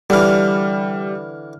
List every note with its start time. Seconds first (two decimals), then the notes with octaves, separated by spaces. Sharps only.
0.10 D3 E3 G3 F6